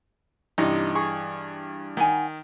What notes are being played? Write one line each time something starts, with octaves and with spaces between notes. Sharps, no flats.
G2 C3 E3 D#4 D#5
G#4 C#6
D#3 D#4 F#5 G#5